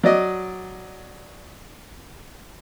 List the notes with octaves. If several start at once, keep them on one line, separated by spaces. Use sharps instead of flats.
F#3 D5 D#5